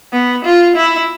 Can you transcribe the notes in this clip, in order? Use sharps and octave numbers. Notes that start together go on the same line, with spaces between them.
B3
F4
E4